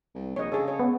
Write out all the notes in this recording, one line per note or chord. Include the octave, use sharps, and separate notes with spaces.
C2
A#1 C#5 D#5
C#3 G#4 A4
C#5
B3